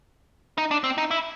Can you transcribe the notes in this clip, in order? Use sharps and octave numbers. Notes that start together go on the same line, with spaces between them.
D#4
D4
C4
D#4
E4